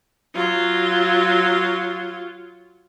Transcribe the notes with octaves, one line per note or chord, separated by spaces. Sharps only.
F#3 F4